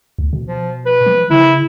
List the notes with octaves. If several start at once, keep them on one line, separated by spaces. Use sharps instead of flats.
D2
B2
F3
B4
F3
C#3 E4